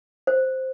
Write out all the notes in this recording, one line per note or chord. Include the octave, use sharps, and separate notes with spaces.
C5